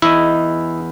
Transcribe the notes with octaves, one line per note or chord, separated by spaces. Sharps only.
E2 E4 D#5